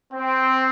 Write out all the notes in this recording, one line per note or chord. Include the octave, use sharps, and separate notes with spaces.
C4